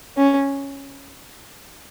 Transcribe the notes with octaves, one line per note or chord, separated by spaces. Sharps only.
C#4